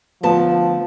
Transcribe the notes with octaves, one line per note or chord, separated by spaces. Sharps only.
D2 F3 B3 A5